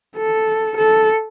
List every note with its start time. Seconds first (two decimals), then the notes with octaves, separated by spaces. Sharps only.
0.17 A4
0.77 A4